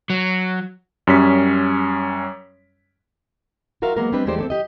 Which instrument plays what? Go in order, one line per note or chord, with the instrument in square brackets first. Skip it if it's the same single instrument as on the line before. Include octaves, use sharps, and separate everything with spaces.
[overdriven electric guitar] F#3
[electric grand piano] F#2 G3 C#4 B6
[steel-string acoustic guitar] F4 F#4 A#4 E5 F5
F#3 G#3 A#3 B3 A#4
G3 G#3 C4 D4 B4
E2 G#3 A3 G4 C5 D5
C4 D4 A4
G4 D#5